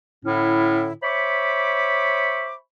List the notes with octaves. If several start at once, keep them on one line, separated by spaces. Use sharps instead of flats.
A2 D3 C#4 E4
C5 C#5 E5 B5 C#6 D6